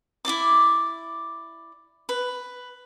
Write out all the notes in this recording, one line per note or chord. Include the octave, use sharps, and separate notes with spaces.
E4 F4 D5 D6
B4